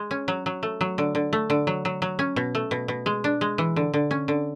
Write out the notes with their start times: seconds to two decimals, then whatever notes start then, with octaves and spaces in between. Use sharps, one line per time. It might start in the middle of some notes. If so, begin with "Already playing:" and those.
Already playing: G#3
0.11 C#4
0.28 F#3
0.46 F#3
0.63 A3
0.81 F#3
0.98 D3
1.15 D3
1.33 A3
1.50 D3
1.67 F#3
1.85 F#3
2.02 F#3
2.19 C#4
2.36 B2
2.55 A3
2.71 B2
2.88 B2
3.06 G#3
3.24 D4
3.41 G#3
3.58 E3
3.76 D3
3.94 D3
4.11 C#4
4.28 D3